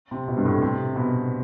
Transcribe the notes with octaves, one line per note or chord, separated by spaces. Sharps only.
C3
B2
G2
A2
C3
B2